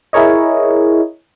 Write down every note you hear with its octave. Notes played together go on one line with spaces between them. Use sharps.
E4 G#4 A#4 C#5 D#5